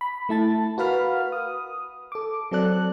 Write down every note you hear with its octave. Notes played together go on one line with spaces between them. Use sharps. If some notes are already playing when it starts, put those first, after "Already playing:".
B5
A3 E4 A5 A6
F#4 A#4 B4 F5 B5 F6
D#6
A4 D6
F#3 C4 A4 D5 F#6